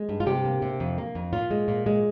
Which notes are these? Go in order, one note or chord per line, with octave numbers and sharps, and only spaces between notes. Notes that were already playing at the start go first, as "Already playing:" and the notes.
Already playing: G#3
G2
F4
C3 G4
A#3
C3
F2
A#3
F2
A#2 F4
G#3
A#2
G#3